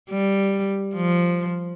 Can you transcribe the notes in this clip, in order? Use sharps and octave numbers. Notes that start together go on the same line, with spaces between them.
G3
F3